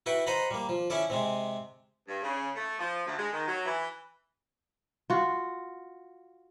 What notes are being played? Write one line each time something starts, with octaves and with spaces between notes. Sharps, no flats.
E4 F#4 B4 G5 C#6
C5 D#5 F#5 A#5 B5
G3 A#3
F3
C#4 E4 A4 D5
C3 G#3 C4
G2
C#3
A3
F3
D2
G#3
D#3
F#3
E3
F4 F#4